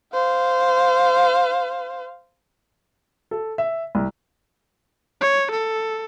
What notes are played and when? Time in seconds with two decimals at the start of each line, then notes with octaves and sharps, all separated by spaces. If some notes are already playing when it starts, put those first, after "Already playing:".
0.13 C5 F5
3.31 A4
3.58 E5
3.95 C2
5.21 C#5
5.51 A4